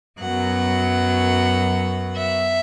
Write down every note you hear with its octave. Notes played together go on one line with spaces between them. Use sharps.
F#2 F#3 B3 F#5
E5